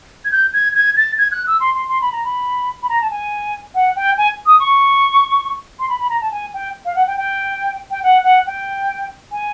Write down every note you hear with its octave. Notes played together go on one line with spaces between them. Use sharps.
G#6
G6
G#6
G#6
A6
G#6
F#6
E6
C6
C6
C6
B5
A#5
B5
B5
A#5
A5
G#5
F#5
G5
G#5
D#6
C#6
C6
B5
B5
A#5
A5
G#5
G5
F5
F#5
G5
G5
G5
F#5
F#5
G5
G#5